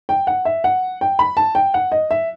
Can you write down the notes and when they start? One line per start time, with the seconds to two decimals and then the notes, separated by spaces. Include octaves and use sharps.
0.09 G5
0.27 F#5
0.45 E5
0.64 F#5
1.01 G5
1.19 B5
1.37 A5
1.55 G5
1.74 F#5
1.92 D#5
2.11 E5